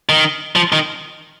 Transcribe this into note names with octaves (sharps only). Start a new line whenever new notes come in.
D#3
F3
D#3